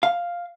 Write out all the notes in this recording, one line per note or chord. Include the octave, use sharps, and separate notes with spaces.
F5